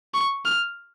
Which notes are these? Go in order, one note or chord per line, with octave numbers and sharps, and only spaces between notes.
C#6
F6